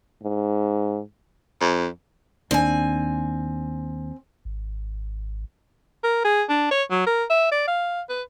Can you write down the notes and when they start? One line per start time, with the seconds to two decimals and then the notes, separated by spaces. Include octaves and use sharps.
0.23 G#2
1.61 F2
2.51 D#2 C4 D4 G#5
4.45 G#1
6.04 A#4
6.25 G#4
6.49 D4
6.71 C#5
6.91 F#3
7.07 A#4
7.30 E5
7.52 D5
7.68 F5
8.09 B4